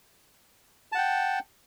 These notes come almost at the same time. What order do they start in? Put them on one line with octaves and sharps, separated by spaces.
A5 F#5 G5